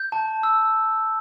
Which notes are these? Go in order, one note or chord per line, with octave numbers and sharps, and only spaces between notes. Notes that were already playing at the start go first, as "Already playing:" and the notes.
Already playing: G6
A5
E6